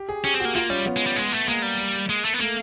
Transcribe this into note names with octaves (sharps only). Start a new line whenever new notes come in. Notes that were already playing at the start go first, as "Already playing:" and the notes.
Already playing: G4
G#4
C#4 G4
C4
A#3 F#4
A#3 F4
G3 C#4
B3
G#3
G3
G#3
A3
G#3 A#3
G3
G#3
A3
B3
A3 A#3